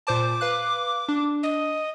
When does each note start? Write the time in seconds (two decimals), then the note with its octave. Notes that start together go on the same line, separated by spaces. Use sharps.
0.07 A#2 C5 A5 D6
0.41 B4 F5 F#6
1.08 D4
1.43 D#5